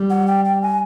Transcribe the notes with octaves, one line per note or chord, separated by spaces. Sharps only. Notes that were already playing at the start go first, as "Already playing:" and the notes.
Already playing: G3
F#5
G5
G5
G#5